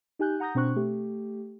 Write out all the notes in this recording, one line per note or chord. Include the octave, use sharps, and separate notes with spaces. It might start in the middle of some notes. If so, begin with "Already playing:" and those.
D#4 G4 G#5 F#6 G6
F#5 A#5 D#6 G6 A#6
B2 C4 D4 C5 C#6 F#6
A3 G4